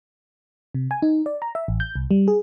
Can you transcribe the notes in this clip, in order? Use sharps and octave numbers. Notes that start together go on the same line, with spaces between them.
C3
G#5
D#4
D5
A#5
E5
A1
G6
C2
G3
G#4